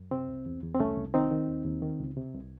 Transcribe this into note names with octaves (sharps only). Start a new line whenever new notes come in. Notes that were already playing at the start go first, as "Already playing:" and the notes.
Already playing: F#2
C3 C4
C2
E2
E2
C4
C2 A3 C#4
C2
D#3 C4 D#4
D#3
D#2
D#2
D#3
C#2
C3
C2